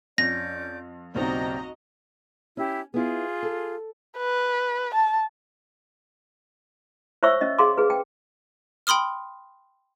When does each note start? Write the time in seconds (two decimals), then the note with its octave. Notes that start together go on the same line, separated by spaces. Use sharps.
0.18 F2 C#4 D5 G6 A#6
1.15 F#1 B1 C4 F#4 G4 D5 D#5 A#5
2.57 C#4 E4 G4
2.94 B3 E4 F4 G#4
3.43 A4
4.18 B4
4.95 A5
7.23 C5 C#5 E5 C#6 E6
7.41 C#4 D#5
7.59 G#4 F5 C6 D6
7.78 G#4 B4
7.90 G5
8.87 G5 B5 C6 D#6 F6